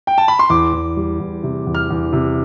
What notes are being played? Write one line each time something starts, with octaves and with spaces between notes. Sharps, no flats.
G5
A5
B5
C6
E2 D6
E2
G3
E2
C3
E2
F6
E2
C3